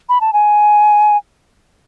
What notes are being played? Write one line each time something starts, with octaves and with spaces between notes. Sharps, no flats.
B5
A5
G#5